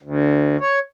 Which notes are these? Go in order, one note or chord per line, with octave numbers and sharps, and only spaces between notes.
D2
C#5